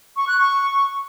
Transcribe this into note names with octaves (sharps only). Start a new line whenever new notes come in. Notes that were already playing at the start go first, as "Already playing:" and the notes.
C#6
F#6
C#6